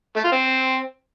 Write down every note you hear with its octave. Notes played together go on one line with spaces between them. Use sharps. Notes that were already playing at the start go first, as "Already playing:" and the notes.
A3
F4
C4